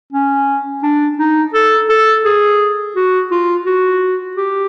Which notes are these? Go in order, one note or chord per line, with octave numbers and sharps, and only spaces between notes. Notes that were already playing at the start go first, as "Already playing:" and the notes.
C#4
D4
D#4
A4
A4
G#4
F#4
F4
F#4
G4